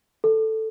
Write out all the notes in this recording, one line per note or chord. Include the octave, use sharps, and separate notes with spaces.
A4